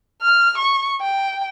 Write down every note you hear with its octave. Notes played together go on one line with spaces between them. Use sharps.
F6
C#6
G5